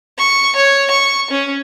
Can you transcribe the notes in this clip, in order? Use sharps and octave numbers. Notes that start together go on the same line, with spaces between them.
C#6
C#5
C#6
C#4